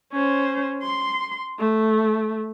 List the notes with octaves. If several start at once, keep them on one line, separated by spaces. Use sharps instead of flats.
C#4 C5
C6
A3